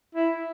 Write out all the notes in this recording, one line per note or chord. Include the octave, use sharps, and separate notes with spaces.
E4